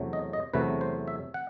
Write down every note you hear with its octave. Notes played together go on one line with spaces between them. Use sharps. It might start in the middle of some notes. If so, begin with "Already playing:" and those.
Already playing: E2 C3 F#3 A3
D#5
D#5
E2 C3 F#3 A3 B4
C5
E5
F#5